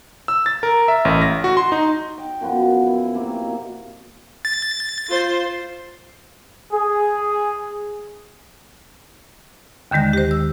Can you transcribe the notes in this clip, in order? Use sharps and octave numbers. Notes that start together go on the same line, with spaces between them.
E6
A6
A#4
E5
A1
A#6
F#4
C6
D#4
G5
F#2 F3 B3 F#4
E4
C3 A#3
B2
A6
F4 C5
G#4
D#2 D3 D#3 G#3 A#6
G4 C5
E6